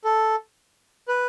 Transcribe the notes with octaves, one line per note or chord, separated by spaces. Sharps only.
A4
B4